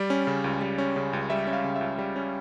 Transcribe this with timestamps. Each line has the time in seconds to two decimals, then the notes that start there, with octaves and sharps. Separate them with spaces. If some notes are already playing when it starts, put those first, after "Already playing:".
Already playing: G3 D5
0.10 C#4
0.27 C#3
0.44 C#2
0.61 G3
0.78 C#4
0.96 C#3
1.13 C#2
1.30 G3 E5
1.47 C#4
1.53 F5
1.64 C#3
1.75 E5
1.81 C#2
1.98 G3
2.16 C#4